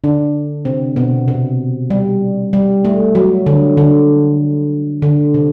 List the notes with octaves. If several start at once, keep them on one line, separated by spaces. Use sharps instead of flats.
D3 D4
C3 C4
B2 B3
C3
G3
G3
A3
F#3
D3
D3
D3
C3